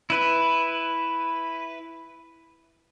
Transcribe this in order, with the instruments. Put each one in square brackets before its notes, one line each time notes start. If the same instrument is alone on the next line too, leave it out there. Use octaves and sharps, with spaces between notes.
[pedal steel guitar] E4 B4